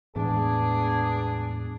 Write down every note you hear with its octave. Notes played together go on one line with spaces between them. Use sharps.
E2 A2 G#3 B3 D4 G#4